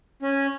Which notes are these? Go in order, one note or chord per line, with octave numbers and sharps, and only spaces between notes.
C#4